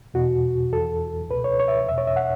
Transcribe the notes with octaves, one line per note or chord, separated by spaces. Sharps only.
E2 B2 F#4
E2 E3 A4
C#2 B2 B4
C#5
C#5
E5
E2 B2 E5
C#5
E5
F#5